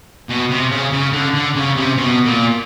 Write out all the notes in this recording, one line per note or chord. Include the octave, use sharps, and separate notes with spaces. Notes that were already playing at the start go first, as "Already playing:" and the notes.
B2
C3
C#3
C#3
D3
D3
C#3
C3
B2
A#2